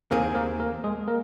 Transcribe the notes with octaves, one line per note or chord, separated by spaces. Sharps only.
D#2 D#3 A#3 C4 G#4 A#4
A#3 A#4
A#3 A#4
G#3 G#4
A#3 A#4